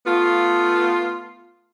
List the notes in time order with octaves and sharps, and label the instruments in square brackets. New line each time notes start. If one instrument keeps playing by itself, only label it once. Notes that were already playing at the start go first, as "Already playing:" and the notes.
[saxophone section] A3 B3 F4